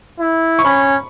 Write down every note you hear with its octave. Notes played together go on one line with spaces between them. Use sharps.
E4
C#6
C#4 B5